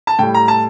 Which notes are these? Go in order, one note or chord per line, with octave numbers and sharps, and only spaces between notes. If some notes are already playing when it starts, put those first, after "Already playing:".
A5
A2 G3 G5
A#5
A5